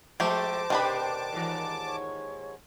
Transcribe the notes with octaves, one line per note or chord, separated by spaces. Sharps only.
F3 G#3 A3 G4 C5 A5 D6
B2 D#3 D4 G4 B4 B5
D#2 G#2 E3
C#5